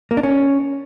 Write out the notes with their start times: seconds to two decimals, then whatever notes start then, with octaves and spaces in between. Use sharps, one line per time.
0.11 A#3
0.17 D4
0.23 C#4